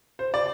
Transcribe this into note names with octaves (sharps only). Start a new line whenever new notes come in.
C5
D5